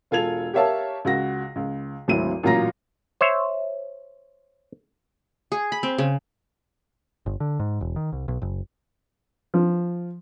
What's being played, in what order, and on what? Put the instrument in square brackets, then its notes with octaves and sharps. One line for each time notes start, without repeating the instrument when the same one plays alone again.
[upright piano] E1 F4 A4 G#6 F7
G4 A#4 C#5 E5 F5 A5
C#2 F#4 A#6
C#2
G#1 D2 F#3 C4 E4 D#7
A1 A#2 F#3 F4 A#5 A#6
[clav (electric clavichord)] C5 C#5 E5
[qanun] G#4
B5
C4
C#3
[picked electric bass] G1
D3
G#2
E1
D#3
C2
B1
F#1
[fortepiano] F3